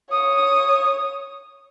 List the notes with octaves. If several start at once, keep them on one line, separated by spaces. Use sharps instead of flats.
C#5 D#6